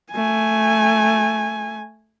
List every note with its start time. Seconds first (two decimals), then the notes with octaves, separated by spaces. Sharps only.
0.12 A3 G#5